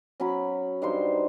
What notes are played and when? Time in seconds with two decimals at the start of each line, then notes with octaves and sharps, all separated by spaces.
0.20 F#3 C#4 B5
0.82 G2 D#4 C5 C6